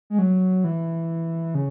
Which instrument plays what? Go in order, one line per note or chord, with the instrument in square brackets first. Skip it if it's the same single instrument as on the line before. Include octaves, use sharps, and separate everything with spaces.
[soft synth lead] G#3
F#3
E3
C#3